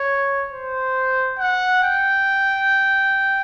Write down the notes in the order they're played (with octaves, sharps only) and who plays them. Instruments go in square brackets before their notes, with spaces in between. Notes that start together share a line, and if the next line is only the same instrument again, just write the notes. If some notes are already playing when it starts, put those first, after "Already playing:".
Already playing: [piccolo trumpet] C#5
C5
F#5
G5